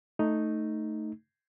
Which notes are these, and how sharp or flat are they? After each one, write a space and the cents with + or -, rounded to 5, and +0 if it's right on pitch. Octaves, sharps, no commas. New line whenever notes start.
A3 +5 D#4 +0